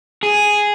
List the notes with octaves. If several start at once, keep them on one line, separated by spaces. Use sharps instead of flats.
G#4